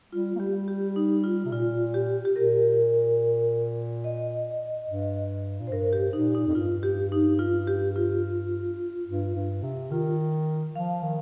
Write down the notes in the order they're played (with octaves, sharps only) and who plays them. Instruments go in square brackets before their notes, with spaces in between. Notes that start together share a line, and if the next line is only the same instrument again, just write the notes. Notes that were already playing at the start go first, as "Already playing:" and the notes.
[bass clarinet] G3 [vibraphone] F4
[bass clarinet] A#3
[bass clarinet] G3 [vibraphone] G4
[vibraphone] G4
D#4
F4
[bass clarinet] C3
[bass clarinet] A#2 [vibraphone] F4
[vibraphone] G4
G4
[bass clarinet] A#2 [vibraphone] A#4
[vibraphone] D#5
[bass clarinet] G2
A#2
[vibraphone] C5
[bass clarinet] G2 [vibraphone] A#4
[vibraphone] G4
[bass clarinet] A#2 [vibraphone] D#4
[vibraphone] D#4
[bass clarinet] F2
[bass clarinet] G2 [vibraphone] F4
[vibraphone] G4
D#4
F4
G4
F4
[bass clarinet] G2
G2
C3
[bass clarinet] D#3 [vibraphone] F4
[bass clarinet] F3 [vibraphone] F5
[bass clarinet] D#3